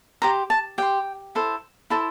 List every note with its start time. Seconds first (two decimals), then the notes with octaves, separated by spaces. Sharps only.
0.22 G4 C5 A#5
0.50 A5
0.78 G4 C5 G5
1.35 E4 A4 C5
1.90 E4 A4 C5 A5